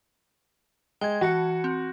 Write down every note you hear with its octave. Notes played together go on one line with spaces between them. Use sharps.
G#3 G5 G#6
E3 F#4 A5 C#7
C4